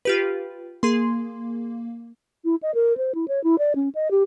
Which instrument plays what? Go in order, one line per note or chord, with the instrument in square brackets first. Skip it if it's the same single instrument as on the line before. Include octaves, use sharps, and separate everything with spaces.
[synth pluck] F4 G4 B4
[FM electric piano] A#3 [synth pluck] G#4 C6
[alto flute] E4
D#5
A#4
C5
E4
C#5
E4
D5
C#4
D#5
G4